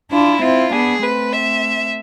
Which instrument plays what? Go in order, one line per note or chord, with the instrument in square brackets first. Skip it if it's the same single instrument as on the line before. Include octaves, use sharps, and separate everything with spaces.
[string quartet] D4 F4 [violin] E4
[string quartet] C4 E4 [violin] F4
[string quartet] B3 D4 [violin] G#4
[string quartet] A3 C4 [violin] B4
[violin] E5